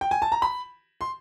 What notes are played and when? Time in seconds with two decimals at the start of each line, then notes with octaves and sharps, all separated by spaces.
0.01 G5
0.11 G#5
0.22 A5
0.32 A#5
0.42 B5
1.01 C6